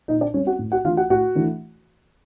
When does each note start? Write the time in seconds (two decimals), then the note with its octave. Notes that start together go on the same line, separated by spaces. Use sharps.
0.08 A#2 D#4 D#5
0.21 D4 D5
0.34 G3 C4 C#4 C#5
0.47 F#4 F#5
0.59 A2
0.72 F#4 F#5
0.84 E3 A3 D4 F4 F5
0.97 F#4 F#5
1.10 A2 F#4 F#5
1.35 E3 A3 D4